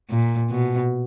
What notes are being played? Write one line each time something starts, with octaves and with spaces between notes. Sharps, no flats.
A#2
B2